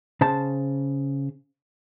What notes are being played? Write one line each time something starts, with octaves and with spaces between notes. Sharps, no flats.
C#3 C5 A5